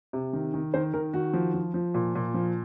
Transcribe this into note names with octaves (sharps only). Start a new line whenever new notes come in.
C3
D#3
D#3
D#3 C5
D#3 A#4
D#3 F#4
F3
F3
F3
A#2
A#2
F3